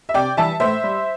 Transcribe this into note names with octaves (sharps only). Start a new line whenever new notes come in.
E5
C3 D5 G5
E3 G3 E5 A5
A2 C5 E5
G3